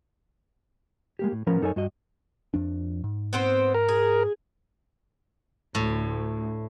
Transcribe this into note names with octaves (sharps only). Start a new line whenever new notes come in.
G#3 A#3 G4
A2
A2 F3 B3 C#4 A#4 B5
F#2 D#4 A4 A#4 C#5 G#5
G2 F#4 D#5
F2 F3 D4
G#2
B3 C4 C5
A#4
G#4
D2 A2